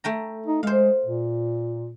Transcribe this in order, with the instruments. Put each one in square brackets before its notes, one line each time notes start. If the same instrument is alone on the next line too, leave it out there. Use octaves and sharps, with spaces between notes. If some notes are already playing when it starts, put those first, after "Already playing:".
[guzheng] A3 G5 A#5
[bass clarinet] D#4
[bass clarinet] G#3 [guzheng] C5 F5
[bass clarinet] A#2